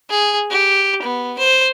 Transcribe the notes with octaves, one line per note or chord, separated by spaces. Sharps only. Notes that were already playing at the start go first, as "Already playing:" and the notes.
G#4
G4
B3
C5